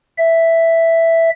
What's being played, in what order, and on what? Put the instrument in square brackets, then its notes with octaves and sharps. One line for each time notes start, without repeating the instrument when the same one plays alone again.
[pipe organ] E5